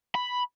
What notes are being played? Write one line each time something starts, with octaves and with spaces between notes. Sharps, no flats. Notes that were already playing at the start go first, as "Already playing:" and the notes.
B5